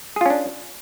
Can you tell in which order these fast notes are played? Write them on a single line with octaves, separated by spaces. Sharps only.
G#4 F4 C#4 D4